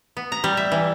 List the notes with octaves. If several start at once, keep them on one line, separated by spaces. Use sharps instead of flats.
B3
A#5
G3
E5
E3